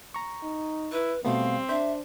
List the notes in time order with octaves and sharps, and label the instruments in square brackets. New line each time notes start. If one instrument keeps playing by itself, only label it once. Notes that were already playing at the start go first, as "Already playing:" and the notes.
[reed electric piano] A#5 C#6
[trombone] D#4
[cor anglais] E4 [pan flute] B4
[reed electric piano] B2 A3 B3 [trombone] G3 [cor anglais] C4 [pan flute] F5
[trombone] D4 [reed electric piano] C5 [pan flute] E5